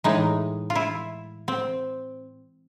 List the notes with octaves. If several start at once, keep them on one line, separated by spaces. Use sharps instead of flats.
A2 E3 G#3 D#4
F4
E4
C4